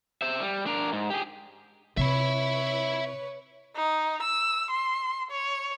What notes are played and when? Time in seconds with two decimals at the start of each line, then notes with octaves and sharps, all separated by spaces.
0.22 C5 E5
0.40 G3
0.66 D4 A#4
0.93 G#2
1.10 G4 G#4
1.97 C3 B4 C#5 E5 B5
3.76 D#4
4.22 E6
4.71 C6
5.31 C#5